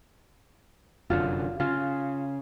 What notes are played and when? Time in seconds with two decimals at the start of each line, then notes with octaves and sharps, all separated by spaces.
1.10 F1 F#2 D3 F4
1.60 C#3 F4